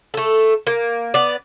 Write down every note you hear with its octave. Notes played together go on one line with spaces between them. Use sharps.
A3 A4
A#3
B3 D5